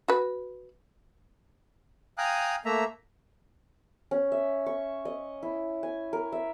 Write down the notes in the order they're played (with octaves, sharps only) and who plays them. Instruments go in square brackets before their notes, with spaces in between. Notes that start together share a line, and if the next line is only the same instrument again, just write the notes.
[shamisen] F#4 B4
[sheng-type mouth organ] F5 G5 G#5 A#5 D#6 F#6
A3 A#3 E5 A#5
[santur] C#4
E5
C#6
D#5
E4
G#5
A#4
E5